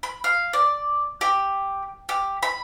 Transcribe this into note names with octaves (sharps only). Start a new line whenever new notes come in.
B5
F5
D5
G4
G4
B5